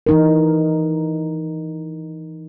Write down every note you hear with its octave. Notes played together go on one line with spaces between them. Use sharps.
E3 D#4 A#4